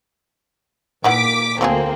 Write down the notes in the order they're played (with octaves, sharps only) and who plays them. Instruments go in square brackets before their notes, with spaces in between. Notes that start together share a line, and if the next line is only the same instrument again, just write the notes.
[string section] A#2 D6 B6 [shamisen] D#3 E3 F#5
[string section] D2 A#3 C4 [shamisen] F3 F#3 G#4